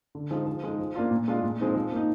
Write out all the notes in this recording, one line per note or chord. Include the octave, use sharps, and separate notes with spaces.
D3
F3 G#3 D#4
F3
G#3 D#4
F3
A#3 D4 F4
A#2
G#3 D4 F4
A#2
F3 G#3 C4 D#4
F3
A#3 D#4